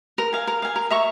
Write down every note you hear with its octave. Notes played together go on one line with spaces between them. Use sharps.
A#4
F5 G#5
A#4
F5 G#5
A#4
E5 A#5 C#6